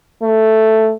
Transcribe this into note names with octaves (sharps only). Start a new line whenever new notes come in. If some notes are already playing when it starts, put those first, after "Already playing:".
A3